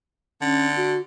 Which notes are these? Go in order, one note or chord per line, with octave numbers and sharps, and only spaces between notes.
D3 C#4
F#4